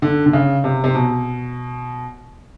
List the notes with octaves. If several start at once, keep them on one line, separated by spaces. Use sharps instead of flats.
D3
D3
C#3
C3
C3
B2